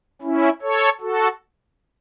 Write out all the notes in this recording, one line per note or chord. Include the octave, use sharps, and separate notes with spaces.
C#4 E4
A4 C#5
F#4 A4